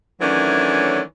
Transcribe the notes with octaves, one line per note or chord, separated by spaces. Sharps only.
D#3 E3 F#3 A3 C#4 D4